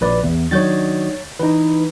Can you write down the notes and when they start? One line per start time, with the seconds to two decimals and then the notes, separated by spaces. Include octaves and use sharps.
0.01 A#1 B4 D5
0.23 E2
0.51 D#3 F#3 D4 C#5 G6 A6
1.39 E3 D#4 B4